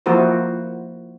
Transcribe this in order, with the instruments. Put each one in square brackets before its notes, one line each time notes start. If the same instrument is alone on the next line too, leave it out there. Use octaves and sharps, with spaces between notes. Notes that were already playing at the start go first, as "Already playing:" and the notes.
[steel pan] F3 A#3 E4 F#4 A#4 C5